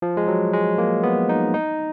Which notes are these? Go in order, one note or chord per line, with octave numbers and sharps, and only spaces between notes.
F3
G#3
F#3
G#3
A#3
B3
D#4
D#4